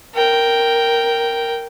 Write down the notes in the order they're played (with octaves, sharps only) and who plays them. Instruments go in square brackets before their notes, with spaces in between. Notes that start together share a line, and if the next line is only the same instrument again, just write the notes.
[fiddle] A#4 G5